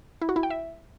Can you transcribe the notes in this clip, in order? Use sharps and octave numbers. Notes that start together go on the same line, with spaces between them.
E4
F#4
E4
G5
E5